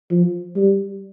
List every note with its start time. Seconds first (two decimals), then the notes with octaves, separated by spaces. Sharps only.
0.11 F3
0.56 G3